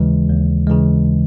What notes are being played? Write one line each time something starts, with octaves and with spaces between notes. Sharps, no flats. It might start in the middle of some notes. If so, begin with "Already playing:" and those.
Already playing: D#2 C#3 E3 G#3
D#2
C#3 E3 G#3